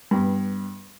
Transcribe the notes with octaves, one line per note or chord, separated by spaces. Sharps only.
G2 B3